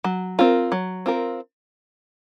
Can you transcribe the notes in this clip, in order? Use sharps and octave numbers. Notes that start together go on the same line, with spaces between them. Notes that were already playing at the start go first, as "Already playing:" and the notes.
F#3
C4 F4 A#4
F#3
C4 F4 A#4